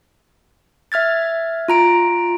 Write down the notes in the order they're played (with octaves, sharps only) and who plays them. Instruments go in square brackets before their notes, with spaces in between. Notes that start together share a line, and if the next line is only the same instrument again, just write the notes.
[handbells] E5 F6 G#6 A6
F4 A#5 D7